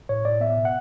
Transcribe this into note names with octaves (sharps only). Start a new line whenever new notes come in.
A2 C#5
A2 D5
B3 E5
B2
F#5